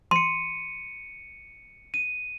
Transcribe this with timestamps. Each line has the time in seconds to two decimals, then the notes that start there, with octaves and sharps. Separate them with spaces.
0.11 C6 C#7 D#7
1.94 D#7